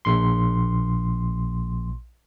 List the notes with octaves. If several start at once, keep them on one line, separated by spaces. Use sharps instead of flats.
A#1 C6